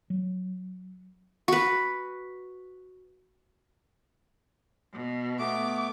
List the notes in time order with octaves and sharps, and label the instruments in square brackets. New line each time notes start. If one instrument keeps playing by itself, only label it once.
[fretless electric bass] F#3
[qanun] F#4 B4
[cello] B2
[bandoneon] A3 B3 [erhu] D6